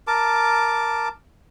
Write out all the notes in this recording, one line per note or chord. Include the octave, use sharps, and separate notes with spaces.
A#4 A5 D6